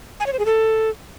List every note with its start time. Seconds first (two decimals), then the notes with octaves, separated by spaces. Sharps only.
0.20 G#5
0.26 C#5
0.33 C5
0.39 G#4
0.46 A4